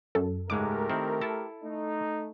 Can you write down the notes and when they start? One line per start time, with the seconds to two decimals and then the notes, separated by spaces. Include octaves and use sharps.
0.15 F#2 A4
0.50 C#2 G#2 G#3 A3 G4 A#4 D6
0.89 D#3 C4 E4
1.21 E4 A4 A5
1.64 A3 D#4